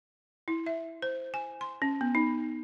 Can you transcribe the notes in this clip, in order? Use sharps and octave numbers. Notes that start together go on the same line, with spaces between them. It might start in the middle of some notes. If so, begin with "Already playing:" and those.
E4
E5
C5
G#5
C6
C#4
B3
D#4